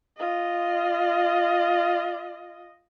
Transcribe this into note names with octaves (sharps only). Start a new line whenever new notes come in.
F4 D#5